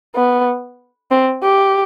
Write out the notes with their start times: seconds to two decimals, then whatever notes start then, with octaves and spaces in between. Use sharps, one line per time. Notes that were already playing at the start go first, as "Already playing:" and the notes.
0.16 B3
1.11 C4
1.43 G4